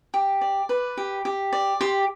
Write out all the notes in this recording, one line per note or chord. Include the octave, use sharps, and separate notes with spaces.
G4
D5
B4
G4
G4
D5
G4 C6